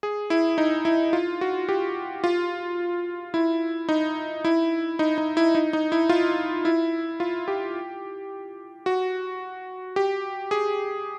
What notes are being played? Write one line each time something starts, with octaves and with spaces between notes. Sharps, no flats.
G#4
E4
D#4
E4
F4
F#4
G4
F4
E4
D#4
E4
D#4
D#4
E4
D#4
D#4
E4
F4
E4
F4
G4
F#4
G4
G#4